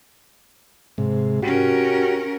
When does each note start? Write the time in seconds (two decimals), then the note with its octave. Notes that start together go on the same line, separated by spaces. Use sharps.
0.98 G#2 C3
1.42 C#4 F#4 G4 A#4